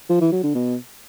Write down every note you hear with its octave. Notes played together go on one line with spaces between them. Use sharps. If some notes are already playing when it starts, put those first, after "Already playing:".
F3
E3
F#3
D3
B2